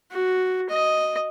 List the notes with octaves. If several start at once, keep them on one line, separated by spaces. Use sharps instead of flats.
F#4
D#5